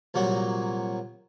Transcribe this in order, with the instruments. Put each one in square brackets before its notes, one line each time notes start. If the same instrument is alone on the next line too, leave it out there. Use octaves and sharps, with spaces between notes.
[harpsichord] C2 A#2 F#3 F#4